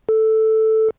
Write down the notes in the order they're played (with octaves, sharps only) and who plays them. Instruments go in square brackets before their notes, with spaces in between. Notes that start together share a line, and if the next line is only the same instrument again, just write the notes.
[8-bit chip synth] A4